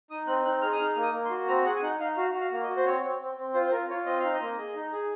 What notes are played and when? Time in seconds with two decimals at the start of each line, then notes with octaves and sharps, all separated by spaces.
0.11 D#4 D#6
0.27 C4 F#6
0.45 D#4 F#6
0.62 G#4 F6
0.72 D#6
0.79 D#4 F6
0.96 A#3
1.03 D#6
1.13 A#3
1.25 C6
1.30 F#4
1.47 C4 A#5
1.65 G#4 F#5
1.76 G#5
1.82 D#4 F#5
2.00 D#4 F5
2.17 F#4 F5
2.34 F#4
2.40 F5
2.52 A#3
2.63 D#5
2.68 F#4
2.76 C5
2.86 C4 C#5
3.03 C4
3.21 C4
3.37 C4
3.54 F4 C5
3.67 C5
3.71 F4 A#4
3.89 F4 C#5
4.06 C4 D#5
4.20 D#4 F5
4.33 D#5
4.41 A#3
4.58 G#4
4.75 D#4
4.93 G#4